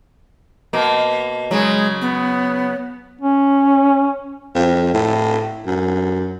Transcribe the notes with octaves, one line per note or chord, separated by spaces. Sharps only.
B2 A#3
C#3 F#3 G#3
B3
C#4
F2
A2
F#2